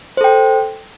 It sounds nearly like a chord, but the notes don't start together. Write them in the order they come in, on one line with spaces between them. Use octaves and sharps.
C5 A4 G5